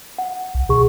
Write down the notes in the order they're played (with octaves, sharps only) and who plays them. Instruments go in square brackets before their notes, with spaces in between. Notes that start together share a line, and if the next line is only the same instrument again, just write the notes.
[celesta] F#5
[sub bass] C2
[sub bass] B2 [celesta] G#4 C#6